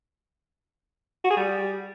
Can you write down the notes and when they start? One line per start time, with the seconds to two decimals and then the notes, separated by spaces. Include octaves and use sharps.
1.24 F#4
1.30 G#4
1.36 G3